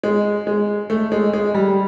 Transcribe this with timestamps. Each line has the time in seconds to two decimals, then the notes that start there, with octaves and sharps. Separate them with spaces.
0.03 G#3
0.47 G#3
0.90 A3
1.12 G#3
1.33 G#3
1.54 G3